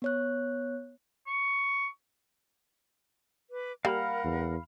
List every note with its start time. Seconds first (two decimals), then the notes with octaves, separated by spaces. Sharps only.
0.02 B3 C#5 F#6
1.27 C#6
3.51 B4 D6
3.85 G3 A#3 A#4 F5 F#5 B5 F6
4.24 E2